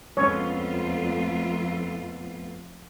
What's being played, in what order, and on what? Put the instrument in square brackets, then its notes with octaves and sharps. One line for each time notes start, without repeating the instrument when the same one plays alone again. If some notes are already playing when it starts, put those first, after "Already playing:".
[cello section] F2 A3 F4 [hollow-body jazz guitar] G#3 B3 C#4 [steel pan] C#5